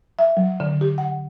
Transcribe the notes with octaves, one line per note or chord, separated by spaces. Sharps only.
E5
F#3
D3
G4
F#5